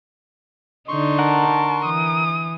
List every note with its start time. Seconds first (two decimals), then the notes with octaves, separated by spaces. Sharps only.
0.89 D3 D#4 C6 C#6
1.19 A#4 F#5 A5
1.85 E3 D#6